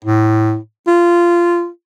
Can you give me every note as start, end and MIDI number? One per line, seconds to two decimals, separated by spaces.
0.05 0.56 45
0.87 1.68 65